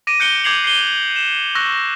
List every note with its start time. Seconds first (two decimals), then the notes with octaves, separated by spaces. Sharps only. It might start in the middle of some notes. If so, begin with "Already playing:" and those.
0.07 D6 A#6 D7 D#7
0.20 F#6 G6 C#7 D7 G7
0.44 D6 G6 G#6 C7 F7 F#7
0.64 C7 D#7 G7
1.16 E7
1.55 C#6 E6 F#6 A#6